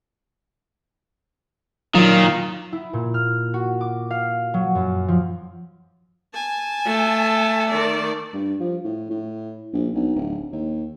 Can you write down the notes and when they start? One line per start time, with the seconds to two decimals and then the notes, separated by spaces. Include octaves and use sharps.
1.95 D#3 F#3 F4 A#4
2.72 E4
2.93 A#2
3.14 F6
3.54 F#4
3.81 D6
4.11 F5
4.54 F#3
4.75 F#2
5.08 F3
6.34 G#5 A5
6.86 A3
7.69 D#3 D5
8.34 G2
8.60 F3
8.84 A2
9.10 A2
9.73 A#1
9.94 B1
10.16 D1
10.52 D#2